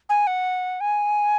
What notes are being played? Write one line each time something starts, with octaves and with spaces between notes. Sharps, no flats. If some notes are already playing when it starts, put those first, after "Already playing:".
G#5
F#5
G#5